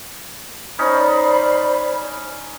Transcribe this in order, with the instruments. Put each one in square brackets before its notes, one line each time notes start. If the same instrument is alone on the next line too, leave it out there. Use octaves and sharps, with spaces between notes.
[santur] C#4 D#4 [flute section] C5 D5 B5